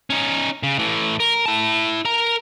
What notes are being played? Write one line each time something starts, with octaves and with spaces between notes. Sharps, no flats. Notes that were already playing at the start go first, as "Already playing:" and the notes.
C#4 D#4
C#3
A2 E3
A#4
E4 A5
A#4 A#5